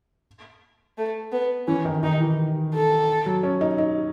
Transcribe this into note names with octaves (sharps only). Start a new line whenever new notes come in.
A3
B3
E3 C#4
D#3
D#3 D#4
E3
A4
F#3
C#4
D#4
D#4